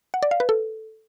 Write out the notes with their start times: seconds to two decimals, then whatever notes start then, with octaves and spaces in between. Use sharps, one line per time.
0.14 F#5
0.23 D5
0.31 F5
0.40 B4
0.49 A4